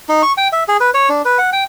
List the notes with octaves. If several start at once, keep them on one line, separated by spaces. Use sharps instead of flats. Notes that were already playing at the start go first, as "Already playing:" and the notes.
D#4
C#6
G5
E5
G#4
B4
C#5
D4
B4
F#5
G5